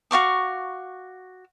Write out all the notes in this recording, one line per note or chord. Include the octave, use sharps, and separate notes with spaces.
F#4 F5 C#6 D6